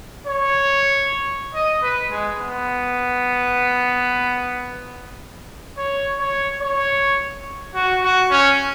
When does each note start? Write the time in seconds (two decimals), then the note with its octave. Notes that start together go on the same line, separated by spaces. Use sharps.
0.27 C#5
1.54 D#5
1.82 B4
2.11 G#3
2.39 B3
5.77 C#5
6.19 C#5
6.61 C#5
7.75 F#4
8.03 F#4
8.30 C#4